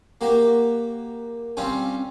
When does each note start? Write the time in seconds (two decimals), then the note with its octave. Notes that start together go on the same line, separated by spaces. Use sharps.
0.21 A#3 F#4 G4
1.57 G3 C4 C#4 F4